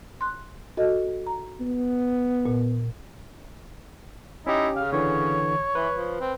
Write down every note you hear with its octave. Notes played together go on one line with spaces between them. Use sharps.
C6 F#6
F#4 A4 D#5
A#5
B3
A#2
C#4 D#4 E4 G4
C#3 F5
D3 E3 C#5
E3 B4
F3
C4